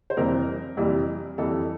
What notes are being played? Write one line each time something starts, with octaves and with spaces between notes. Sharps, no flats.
C5
F2 C3 E3 G3 A#4
F2 C3 E3 G3
F2 E3 G3 A4